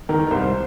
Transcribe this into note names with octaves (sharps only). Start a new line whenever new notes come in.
D#3 A#4
A#4
C2 C5